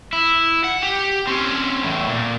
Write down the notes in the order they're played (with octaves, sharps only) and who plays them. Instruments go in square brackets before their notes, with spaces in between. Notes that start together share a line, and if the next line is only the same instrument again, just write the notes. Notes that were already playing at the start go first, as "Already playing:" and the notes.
[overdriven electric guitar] E4
F#5
G4
C4 C#4
E2 A2
A#2